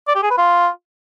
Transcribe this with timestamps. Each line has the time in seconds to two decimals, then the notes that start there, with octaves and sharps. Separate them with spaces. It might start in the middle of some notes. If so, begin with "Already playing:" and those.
0.08 D5
0.15 G4
0.23 G#4
0.30 B4
0.38 F4